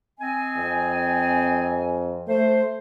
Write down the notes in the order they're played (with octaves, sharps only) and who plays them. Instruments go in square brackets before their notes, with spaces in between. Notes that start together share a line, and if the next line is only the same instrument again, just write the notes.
[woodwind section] C4 D#5 G#5
[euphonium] F2
[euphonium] A3 [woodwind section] C5